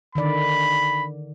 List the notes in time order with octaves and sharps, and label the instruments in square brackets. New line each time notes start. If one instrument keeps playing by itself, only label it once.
[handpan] D3 D#3 D5 [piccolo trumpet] B5